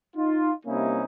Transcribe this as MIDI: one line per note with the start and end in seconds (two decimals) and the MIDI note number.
0.16 0.52 63
0.16 0.52 65
0.66 1.04 48
0.66 1.04 55
0.66 1.04 58
0.66 1.04 61
0.66 1.04 63
0.66 1.04 64